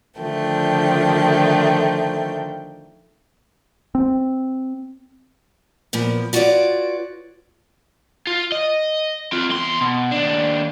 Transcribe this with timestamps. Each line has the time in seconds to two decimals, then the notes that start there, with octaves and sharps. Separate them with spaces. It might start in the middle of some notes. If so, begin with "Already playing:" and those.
0.20 D3 D#3 F3 A3 G5
3.95 C4
5.93 A#2 F3 B3
6.33 F4 F#4 B4 C#5 D5
8.27 F4
8.52 D#5
9.32 C4 F4
9.49 E2 C6
9.81 B2
10.12 D#2 D4